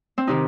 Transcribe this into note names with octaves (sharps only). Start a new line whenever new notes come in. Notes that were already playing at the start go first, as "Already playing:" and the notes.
C4
C3 D#3 D#4